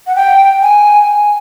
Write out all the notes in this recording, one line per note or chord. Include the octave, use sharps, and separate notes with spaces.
F#5
G5
G#5